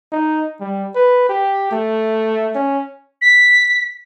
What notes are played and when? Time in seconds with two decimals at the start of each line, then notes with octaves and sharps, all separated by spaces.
0.12 D#4
0.60 G3
0.95 B4
1.29 G4
1.72 A3
2.55 C#4
3.21 B6